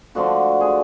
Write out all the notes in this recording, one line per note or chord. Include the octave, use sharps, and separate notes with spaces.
D3 F3 A3 D4 F#4
G#4